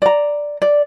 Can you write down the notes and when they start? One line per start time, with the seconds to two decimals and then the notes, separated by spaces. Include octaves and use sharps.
0.02 D5 A#5
0.62 D5